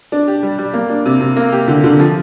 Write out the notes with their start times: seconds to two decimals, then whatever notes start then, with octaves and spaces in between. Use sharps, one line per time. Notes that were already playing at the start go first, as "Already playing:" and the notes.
0.12 D4
0.28 G4
0.43 G3
0.59 G3
0.74 A#3
0.90 D4
1.05 C3
1.21 C3
1.36 A#3
1.52 G4
1.68 D3
1.84 D3
1.99 F3